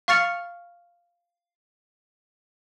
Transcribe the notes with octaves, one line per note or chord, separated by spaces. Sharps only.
F5 C#6 F6 A6 C#7 F7